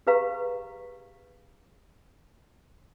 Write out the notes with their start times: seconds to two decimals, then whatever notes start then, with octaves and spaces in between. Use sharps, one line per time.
0.07 G4 G#4 B4 F5 A#5 C#6